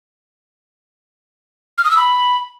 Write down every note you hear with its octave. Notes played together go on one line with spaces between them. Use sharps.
F6
D#6
E6
B5